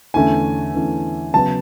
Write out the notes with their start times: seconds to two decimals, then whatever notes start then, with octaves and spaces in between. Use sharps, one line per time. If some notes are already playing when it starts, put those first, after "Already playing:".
0.14 E2 D3 A3 C#4 G#5
0.74 E2 D3 A3 C#4
1.34 C#3 F#3 B3 A5